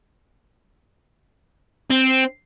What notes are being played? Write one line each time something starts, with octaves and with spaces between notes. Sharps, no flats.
C4